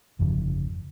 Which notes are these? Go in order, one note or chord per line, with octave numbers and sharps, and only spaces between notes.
G1 F2 C#3 E3